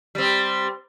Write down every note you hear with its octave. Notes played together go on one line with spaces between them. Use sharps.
G3 C4